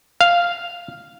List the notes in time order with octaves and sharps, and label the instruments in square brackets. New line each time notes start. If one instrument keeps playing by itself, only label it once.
[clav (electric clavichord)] F5